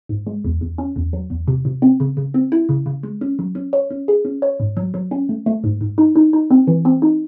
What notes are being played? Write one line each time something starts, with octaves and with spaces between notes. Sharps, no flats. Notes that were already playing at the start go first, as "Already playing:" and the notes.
G#2
G#3
E2
E2
C#4
E2
F#3
E2
C3
C3
C4
C#3
C#3
C4
E4
C#3
C#3
G#3
C#4
F#3
C#4
C#5
C#4
G#4
C#4
C#5
G#2
F#3
F#3
C#4
A3
A3
G#2
G#2
D#4
D#4
D#4
C4
E3
C4
D#4